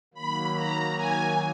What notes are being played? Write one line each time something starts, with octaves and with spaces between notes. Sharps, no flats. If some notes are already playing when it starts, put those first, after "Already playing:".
D#3 F#3 A#3 B5
A#5
G#5